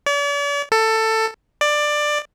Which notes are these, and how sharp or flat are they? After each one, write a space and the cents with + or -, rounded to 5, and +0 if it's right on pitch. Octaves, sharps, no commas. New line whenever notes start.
D5 -45
A4 +15
D5 +15